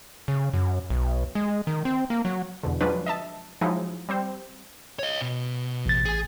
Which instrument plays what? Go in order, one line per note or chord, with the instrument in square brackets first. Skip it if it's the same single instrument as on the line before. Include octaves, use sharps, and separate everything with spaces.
[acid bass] C#3
F#2
B1
G#3
D#3
C4
A#3
F#3
[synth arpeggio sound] E2 B2 D3
F3 F#3 G#3 C#4 D4 B4
D#5 E5 A5
F3 F#3 G#3 D#4 E4
G3 C4 C5
[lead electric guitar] C#5 D#5
B2
[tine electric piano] A1 A6
[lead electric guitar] G#4 G#5